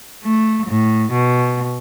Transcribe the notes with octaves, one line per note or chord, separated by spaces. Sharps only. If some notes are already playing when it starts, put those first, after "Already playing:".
A3
A2
B2